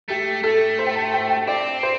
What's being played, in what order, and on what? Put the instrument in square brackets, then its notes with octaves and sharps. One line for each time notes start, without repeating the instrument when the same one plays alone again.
[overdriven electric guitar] A3 [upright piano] G4
[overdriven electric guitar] A3 [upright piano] A4
[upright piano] C5
G5
A5
G5
G5
[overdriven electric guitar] C4 [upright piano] D5
[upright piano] C5